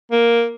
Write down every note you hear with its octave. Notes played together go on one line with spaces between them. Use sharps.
A#3